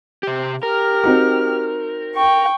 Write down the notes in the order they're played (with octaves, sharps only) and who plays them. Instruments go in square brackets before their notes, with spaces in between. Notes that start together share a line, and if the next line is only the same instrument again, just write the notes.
[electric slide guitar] C3 G4
[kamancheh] G4 F6 [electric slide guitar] A#4
[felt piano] C4 D#4 F#4
[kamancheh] G5 C#6